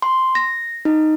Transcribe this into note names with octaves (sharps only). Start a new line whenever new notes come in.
C6
A#6
D#4